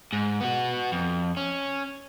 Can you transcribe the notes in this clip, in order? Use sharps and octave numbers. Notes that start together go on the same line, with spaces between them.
G#2
B3 F#4
F2
C#4